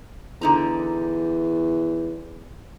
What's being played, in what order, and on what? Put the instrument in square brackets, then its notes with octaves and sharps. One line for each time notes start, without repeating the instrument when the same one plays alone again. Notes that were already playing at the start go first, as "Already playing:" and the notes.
[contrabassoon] E2 [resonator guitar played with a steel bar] D3 D#4 A#5